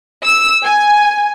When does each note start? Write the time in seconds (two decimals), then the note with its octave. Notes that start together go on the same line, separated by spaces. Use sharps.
0.24 E6
0.64 G#5